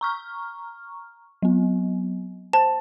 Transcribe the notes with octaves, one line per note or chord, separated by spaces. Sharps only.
A#5 C#6 F6
F#3 B3
C5 A5